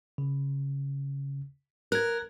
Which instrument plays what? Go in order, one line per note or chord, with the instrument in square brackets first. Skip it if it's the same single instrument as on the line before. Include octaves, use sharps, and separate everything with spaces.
[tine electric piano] C#3
[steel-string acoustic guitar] A#4 [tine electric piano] F#6 G#6